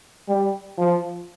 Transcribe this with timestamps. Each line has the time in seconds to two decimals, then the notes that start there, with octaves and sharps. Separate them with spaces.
0.28 G3
0.78 F3